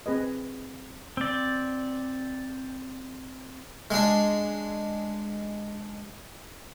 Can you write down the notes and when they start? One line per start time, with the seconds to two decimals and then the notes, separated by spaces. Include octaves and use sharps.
0.06 C4 G#4 B4 D#5
1.17 C4 D5
3.91 G#3 D4